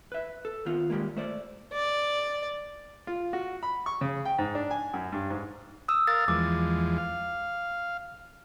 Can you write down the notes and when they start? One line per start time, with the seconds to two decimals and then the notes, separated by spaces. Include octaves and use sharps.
0.12 B4 E5
0.45 A4
0.66 D#3 B3 F4
0.90 D#3 G3 G#3 A#3
1.17 A3 C5 D5
1.73 D5
3.07 F4
3.33 F#4
3.63 B5
3.86 C#6
4.01 C#3
4.25 G5
4.38 G#2
4.55 D4
4.71 G#5
4.94 F#2
5.12 G2
5.30 G#2
5.88 D#6 E6
6.07 A#4 F5 A6
6.28 E2 F3 G#3 D6
6.98 F5